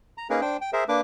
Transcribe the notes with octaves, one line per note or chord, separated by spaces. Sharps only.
A#5
A#3 C#4 D#4 G#4 A#4 B4
D4 C5 G5
G5
G#4 A#4 C5 E5
A#3 D4 B4 D6